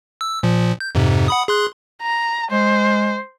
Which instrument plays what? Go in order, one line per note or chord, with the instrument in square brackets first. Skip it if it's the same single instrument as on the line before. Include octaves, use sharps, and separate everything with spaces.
[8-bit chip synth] E6
A#2 F3
G6
F2 G#2 C3
F#5 B5 D#6
G#4 C6 F#6
[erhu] A#5
[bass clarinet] G#3 [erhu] C5